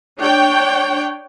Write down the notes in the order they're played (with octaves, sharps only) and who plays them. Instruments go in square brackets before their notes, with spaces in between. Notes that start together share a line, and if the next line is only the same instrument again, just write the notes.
[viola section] D4 C#5 G5